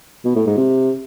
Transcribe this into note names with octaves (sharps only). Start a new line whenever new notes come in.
B2
A2
G#2
C3